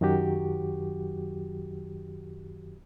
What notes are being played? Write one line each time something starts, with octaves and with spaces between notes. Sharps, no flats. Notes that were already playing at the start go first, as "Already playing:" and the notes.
F#2 D#3 F#3 F#4 G4